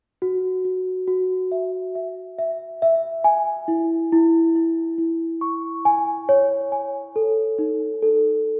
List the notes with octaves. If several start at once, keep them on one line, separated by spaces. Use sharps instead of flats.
F#4
F#4
F#4
E5
E5
E5
E5
G#5
E4
E4
E4
E4
C#6
G#5
C#5
G#5
A4
D#4
A4